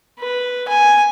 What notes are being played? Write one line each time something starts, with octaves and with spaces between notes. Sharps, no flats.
B4
G#5